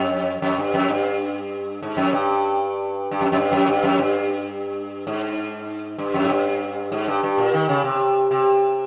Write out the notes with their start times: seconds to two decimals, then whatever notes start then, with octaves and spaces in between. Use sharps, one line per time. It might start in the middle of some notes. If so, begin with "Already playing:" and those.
Already playing: F2
0.42 F2
0.58 G2
0.74 F2
0.89 G2
1.82 G#2
1.97 F2
2.12 G2
3.11 G2
3.21 F2
3.32 F2
3.36 G2
3.52 F2
3.68 G2
3.83 F2
3.98 G2
5.07 G#2
5.98 G2
6.14 F2
6.24 G#2
6.30 G2
6.92 G#2
7.07 G2
7.23 G2
7.38 A#2
7.54 D#3
7.69 C#3
7.84 C3
8.31 C3